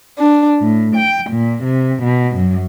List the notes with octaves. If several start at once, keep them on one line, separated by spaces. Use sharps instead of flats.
D4
A2
G5
A#2
C3
B2
F#2